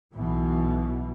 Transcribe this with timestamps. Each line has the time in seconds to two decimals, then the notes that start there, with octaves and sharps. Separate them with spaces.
0.14 B1 B2 E3